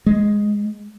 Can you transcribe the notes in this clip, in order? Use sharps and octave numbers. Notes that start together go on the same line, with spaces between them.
G#3